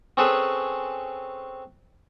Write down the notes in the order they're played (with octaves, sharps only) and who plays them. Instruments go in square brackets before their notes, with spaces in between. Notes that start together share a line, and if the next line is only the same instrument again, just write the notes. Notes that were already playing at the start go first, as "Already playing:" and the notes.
[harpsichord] C4 C#4 G#4 A4 B4 C#5